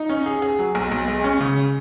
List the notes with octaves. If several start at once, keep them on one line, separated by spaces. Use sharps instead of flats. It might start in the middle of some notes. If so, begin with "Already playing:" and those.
Already playing: D#4
C#4
G#4
G#4
F#3
B1
B1
G#3
C#4
C#3